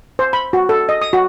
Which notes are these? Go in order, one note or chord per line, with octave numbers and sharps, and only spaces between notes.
C5
B5
F#4
A4
D#5
D#6
F#4